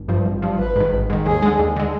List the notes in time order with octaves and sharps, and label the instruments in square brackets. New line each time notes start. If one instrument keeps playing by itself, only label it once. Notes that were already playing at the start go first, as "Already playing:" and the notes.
Already playing: [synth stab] G#1
G2 F3
G#1
G2 F3
[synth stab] G#1 [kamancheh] B4
[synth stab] G#2 D#3
G#1
G#2 D#3
[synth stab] D#2 [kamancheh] G#4
[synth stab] D3 G#3
D#2
D3 G#3